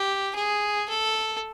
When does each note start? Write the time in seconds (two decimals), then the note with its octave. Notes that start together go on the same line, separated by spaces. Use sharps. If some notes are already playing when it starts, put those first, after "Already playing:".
Already playing: G4
0.35 G#4
0.89 A4